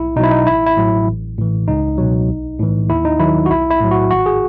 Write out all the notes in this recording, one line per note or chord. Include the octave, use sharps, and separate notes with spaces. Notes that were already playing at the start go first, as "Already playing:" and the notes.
Already playing: B1 E4
B2 F#3 D#4 E4
D#4
A1 E4
E4
A2 F#3
A1
A2 E3
C#2 D#4
B2 F#3
B1
A2 E3
D#2 E4
D#4
D#3 F#3 E4
F#4
B1 E4
E4
A2 F#3
F#4
G#1 F#4
G#4